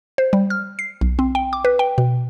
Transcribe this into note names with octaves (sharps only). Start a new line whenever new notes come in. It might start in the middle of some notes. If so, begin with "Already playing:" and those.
C5
G3
F6
C7
B1
C4
G5
D6
B4
G5
B2